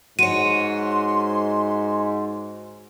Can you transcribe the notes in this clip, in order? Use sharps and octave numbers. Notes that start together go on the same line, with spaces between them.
G#2 F#4 C#5 C6 D#7